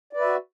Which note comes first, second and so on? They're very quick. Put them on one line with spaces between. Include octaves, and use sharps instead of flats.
D5 B4 E5 F#4